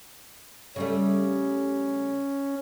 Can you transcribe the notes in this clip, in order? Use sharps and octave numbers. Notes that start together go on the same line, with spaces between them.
C#3 G3 A3 C#4